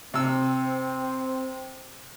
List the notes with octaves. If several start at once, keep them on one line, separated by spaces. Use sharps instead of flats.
C3 C4 E6